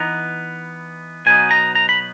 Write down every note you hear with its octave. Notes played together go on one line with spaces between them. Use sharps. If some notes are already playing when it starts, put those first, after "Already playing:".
Already playing: E3 B3 D#4 A#5
B2 F#3 B3 D#4 G#5
A#5
A#5
B5